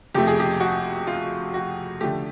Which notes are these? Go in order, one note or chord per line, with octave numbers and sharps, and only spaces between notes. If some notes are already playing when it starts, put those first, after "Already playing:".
F2 C3 F3 A3 G4
G#4
G4
F#4
F4
F#4
D3 F3 A3 G4